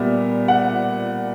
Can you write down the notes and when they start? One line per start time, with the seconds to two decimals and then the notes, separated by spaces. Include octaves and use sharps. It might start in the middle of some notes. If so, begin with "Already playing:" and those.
Already playing: A#2 G3 B3 E5
0.48 F#5